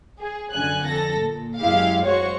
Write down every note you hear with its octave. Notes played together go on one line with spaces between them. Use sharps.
G#4
F#2 D3 G#5 F#6
F2 A4 A#6
A#2
F#2 G#3 E4 G4 F5 F6
G#3 F#4 C5 C#5 C#6